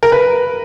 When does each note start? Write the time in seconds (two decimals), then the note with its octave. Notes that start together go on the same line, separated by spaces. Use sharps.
0.03 A#4
0.12 B4